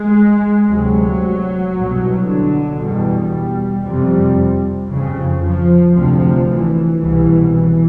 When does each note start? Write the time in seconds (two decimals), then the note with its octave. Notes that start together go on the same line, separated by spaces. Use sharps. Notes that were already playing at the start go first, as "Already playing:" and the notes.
Already playing: G#3
0.68 D2 C3 F#3
1.73 C2 B2
2.26 D3
2.78 E2 B2 G3
3.84 F2 C3 G3
4.90 F2 C#3
5.41 F3
5.94 D2 C3 F3
6.48 E3
6.99 C2 B2 E3
7.52 E3